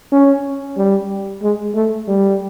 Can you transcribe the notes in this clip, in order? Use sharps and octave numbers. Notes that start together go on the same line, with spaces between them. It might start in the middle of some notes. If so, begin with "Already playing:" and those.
C#4
G3
G#3
A3
G3